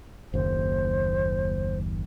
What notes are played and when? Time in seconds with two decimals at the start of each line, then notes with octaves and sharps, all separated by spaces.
0.34 F#1 D#2 C5